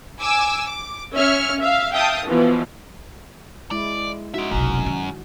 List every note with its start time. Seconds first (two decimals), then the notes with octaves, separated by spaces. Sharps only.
0.20 G#5 D6 E6
0.66 D6
1.13 C#4 E5 F6 C#7
1.59 E5 F5
1.93 E5 F5 G5 A5 D#6
2.27 B2 E3 F3
3.71 G#3 E4 D5
4.34 G#3 D#4 F#4 E5
4.51 F1 B1 F#2
4.86 D#3